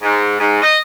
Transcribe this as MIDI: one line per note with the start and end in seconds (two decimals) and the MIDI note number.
0.03 0.35 44
0.40 0.58 44
0.62 0.77 75